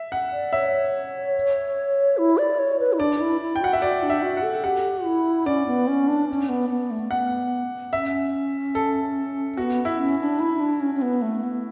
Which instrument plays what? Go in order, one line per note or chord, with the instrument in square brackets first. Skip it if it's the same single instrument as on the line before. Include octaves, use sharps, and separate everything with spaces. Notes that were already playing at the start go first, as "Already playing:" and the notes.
Already playing: [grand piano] E5
F#5
[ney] D5
[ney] C#5 [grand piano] E5
[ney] E4
D5
C#5
B4
E4
[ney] D4 [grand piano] D5
[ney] E4
E4
[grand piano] G5
[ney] F#4 [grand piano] F#5
[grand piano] E5
[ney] F#4 [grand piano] D5
[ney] D4
[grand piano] E5
[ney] F#4
[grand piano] F#5
[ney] A4
[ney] G4 [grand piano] F#5
[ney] E4
[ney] C#4 [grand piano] D5
[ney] B3
C#4
D4
C#4
B3
B3
A3
[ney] B3 [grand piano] F#5
[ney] C#4 [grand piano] E5
[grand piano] A4
[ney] B3 [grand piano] F#4
[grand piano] E4
[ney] C#4
D4
E4
D4
C#4
C#4
B3
A3
B3